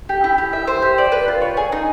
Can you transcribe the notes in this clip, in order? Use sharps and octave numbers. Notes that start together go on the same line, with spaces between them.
G4
E4
G4
E5
C5
G4
D5
B4
F4
C#5
G#4
D#4